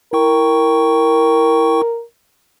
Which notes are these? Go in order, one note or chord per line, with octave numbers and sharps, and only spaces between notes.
E4 A#4 G5 C#6